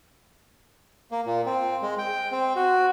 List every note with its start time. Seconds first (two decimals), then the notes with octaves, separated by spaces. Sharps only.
1.11 A#3
1.26 A#2
1.46 C4
1.82 G#3
1.98 G5
2.32 C4
2.56 F#4